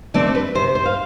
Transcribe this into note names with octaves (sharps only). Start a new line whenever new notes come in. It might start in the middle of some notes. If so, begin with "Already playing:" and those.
D3 A3 C4 D5
B4
C3 C5
C5
F5